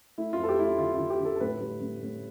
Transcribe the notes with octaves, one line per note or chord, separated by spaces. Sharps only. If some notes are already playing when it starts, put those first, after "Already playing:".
A3 E4
F2 F4
A4
G4
A3 E4
F4
D3 F4
D3 F4
G4
D3
A4
A4
A2 B4
G3
A2
A2